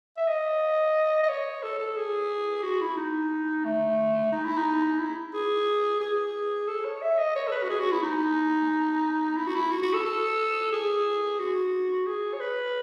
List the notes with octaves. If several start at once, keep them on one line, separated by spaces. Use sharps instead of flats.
E5
D#5
D#5
C#5
A4
A4
G#4
F#4
E4
D#4
A3
D#4
E4
D#4
E4
G#4
G#4
A4
C#5
E5
D#5
C#5
A4
B4
F#4
G#4
F#4
E4
D#4
E4
F#4
E4
F#4
F#4
A4
A4
G#4
F#4
G#4
C#5
B4